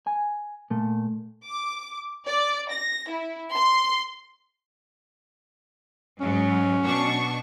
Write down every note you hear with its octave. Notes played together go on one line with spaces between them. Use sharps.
G#5
A#2 A3
D6
D5
A#6
E4
C6
G#2 F#3 C#4
B2 D4 C#6